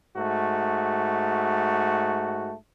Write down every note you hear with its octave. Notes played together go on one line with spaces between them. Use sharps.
G#2 A3 F#4